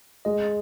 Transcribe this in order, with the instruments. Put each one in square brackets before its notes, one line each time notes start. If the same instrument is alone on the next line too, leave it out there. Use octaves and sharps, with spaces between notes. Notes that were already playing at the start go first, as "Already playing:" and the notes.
[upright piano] G#3 [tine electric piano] D#5